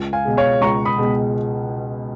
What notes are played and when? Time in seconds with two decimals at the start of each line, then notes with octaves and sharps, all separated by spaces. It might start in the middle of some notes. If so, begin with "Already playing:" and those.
Already playing: C#2
0.13 F5 G#5
0.25 B2 G#3
0.37 C#5 F5
0.61 C#2 A#5 C#6
0.85 B5 D#6
0.98 B2 G#3